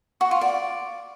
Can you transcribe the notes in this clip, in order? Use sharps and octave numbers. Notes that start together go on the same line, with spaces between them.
F#4
F4
D5